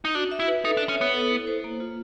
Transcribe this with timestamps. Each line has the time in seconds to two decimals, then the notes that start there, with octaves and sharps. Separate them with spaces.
0.05 D#4
0.15 D4 F#4
0.32 E5
0.40 E4
0.48 B4
0.64 D#4 A4
0.77 D4
0.81 E5
0.89 C#4
0.98 B3 C#5
1.14 A4
1.31 E4
1.47 C5
1.64 A#3
1.80 F4